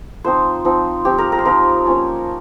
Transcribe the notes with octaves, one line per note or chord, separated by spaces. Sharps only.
F3 C4 D#4 C5
F3 C4 D#4
F3 C4 D#4 G4
A#4
A#4
C5
F3 C4 D#4 A#4
F3 A#3 C#4 F4